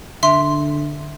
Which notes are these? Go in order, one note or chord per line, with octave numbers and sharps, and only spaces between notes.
D3 E5 C6